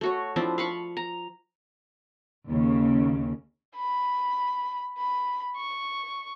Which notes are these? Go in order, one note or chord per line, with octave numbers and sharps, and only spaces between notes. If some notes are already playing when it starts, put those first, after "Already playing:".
A3 F#4 C#5
F3 C4 D4 E4
F5 B5 C#6
A#5
D#2 C#3
B5
B5
C#6